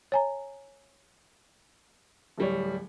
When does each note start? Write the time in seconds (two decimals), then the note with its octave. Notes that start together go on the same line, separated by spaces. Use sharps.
0.12 C#5 G#5 A#5
2.38 D1 G3 C#5